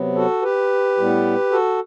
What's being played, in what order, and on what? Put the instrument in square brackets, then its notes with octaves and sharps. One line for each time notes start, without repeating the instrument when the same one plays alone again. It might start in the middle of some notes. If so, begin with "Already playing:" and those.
Already playing: [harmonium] C3 F#3 B3
F#4 A4
G4 B4
A2 G3 B3
F#4 A4